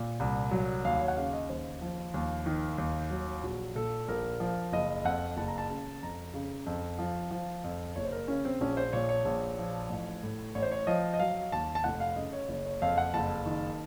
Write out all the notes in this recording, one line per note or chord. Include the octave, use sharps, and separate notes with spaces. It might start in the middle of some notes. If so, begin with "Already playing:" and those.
Already playing: A#2
C2
F#3
D#2 F5
C#5
F#5
C#3 F5
D#5
D#2 C5
F3
D#2
D#3
D#2
F#3
A#1 F#4
A#2 A4
A#1 A#4
F3
F#1 D#5
F2 F#5
F#1 A5
A#5
A5
C#3
F2 A#5
C#3
F2
F3
F3
F2
F#1 C#5
C5
A#4
C#3 C#4
C4
A#1 C#4
C5
A#2 C#5
C#5
A#1
F3
A1
A2
A1 C#5
C5
C#5
F3 D#5
D#5
F#3 F5
D#2 A5
A5
F1 F#5
F5
C#3 D#5
C#5
F#1 C#5
C#5
F2 F5
F#5
F#1 A5
D#3